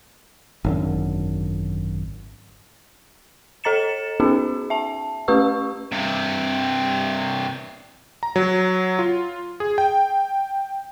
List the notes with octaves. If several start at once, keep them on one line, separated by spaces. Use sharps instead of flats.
G#1 F#2 D3
A4 D#5 A#5 A6 C#7 E7
B3 C#4 D#4 F#4 G#4
E5 A5
A3 C#4 G4 B4 C#6 E6
G2 C3
A#5
F#3
F4
G#4
G5